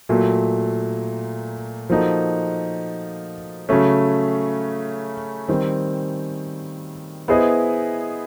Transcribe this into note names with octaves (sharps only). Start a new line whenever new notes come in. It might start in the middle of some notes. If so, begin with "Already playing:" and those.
A#2 F#3 A3
F3 A#3 D#4 F#4 A4
C#3 F#3 A3 C#4
D#3 G3 C4
B3 E4 G#4 C5 D#5